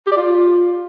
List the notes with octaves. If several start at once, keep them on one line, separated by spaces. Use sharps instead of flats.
G4
D5
F4